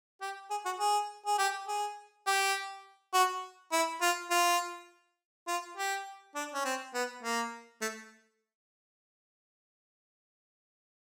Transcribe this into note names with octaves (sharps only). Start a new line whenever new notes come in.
G4
G#4
F#4
G#4
G#4
G4
G#4
G4
F#4
E4
F4
F4
F4
G4
D4
C#4
C4
B3
A#3
A3